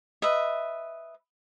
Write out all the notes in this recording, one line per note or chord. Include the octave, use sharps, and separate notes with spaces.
B4 D#5 E5